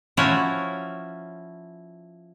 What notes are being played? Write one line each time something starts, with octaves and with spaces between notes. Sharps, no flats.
F3 C#4 E4 F#4 C#5